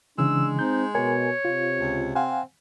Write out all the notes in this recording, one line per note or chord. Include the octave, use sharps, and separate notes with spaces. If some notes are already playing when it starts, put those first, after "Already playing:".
C#3 E3 G#3 D4 E6
C4 D#4 G6
B2 A#4 C#5 G#5
C3 F4
C#2
C4 F5 F#5 G#5